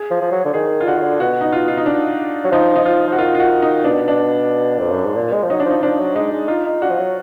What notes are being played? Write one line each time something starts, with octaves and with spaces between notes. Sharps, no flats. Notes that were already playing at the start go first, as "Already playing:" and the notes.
Already playing: G#4
F3
F3
F#3
D3
D#3 G#4
F4
D3 F#4
D#3
D3
B2 F#4
D#4
F4
F4
D#4
D4
F#3
F3 D#4
D#4
F3 F4
F3 F#4
D#3 F4
F4
F#4
D#4
B2 D4
D4
F2
F#2
G#2
A#2
G#3
F3
F#3 D#4
D4
F3
D#4
F3 D4
F#3
G#3 D#4
G#3
D#4 F4
D#4
D4 F#4
F3
F#3